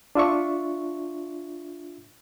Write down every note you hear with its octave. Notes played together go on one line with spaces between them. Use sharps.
D4 F4 E5 C#6